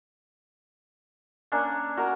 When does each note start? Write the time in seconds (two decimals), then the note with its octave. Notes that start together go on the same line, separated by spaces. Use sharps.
1.52 A#3 C#4 D4
1.97 F#4 A#4 A#5